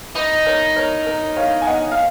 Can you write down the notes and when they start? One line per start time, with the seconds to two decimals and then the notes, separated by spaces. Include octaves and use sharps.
0.15 D#4 B4
0.46 A#4 C#5
0.76 A#4 C#5
1.06 A#4
1.37 C#5 F5
1.62 G#5
1.67 D#5 F#5
1.92 F5